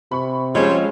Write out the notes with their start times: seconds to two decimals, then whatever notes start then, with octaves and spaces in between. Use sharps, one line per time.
0.11 C3 B5 C#6
0.55 F3 G3 G#3 C4 C#4 G#4 C5 C#5